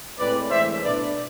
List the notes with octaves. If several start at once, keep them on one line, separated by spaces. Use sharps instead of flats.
A2 G#3 C4 B4 D5
A2 E3 G#3 D4 C5 E5
B2 A3 D4 B4 D5